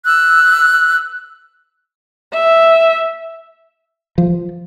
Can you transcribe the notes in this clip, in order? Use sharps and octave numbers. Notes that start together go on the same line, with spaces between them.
E6 F#6
E5
F3